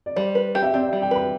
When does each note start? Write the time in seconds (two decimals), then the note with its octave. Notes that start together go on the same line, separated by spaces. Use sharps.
0.06 D5
0.16 G3 C5
0.35 B4
0.55 G4
0.62 E5
0.74 C4 D5
0.87 E5
0.93 G3
1.02 G5
1.11 B4 B5